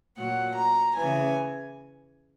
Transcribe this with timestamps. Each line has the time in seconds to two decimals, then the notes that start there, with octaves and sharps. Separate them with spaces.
0.17 A#2 F#3 F#5
0.56 A#5
0.96 C#3 E3 G#5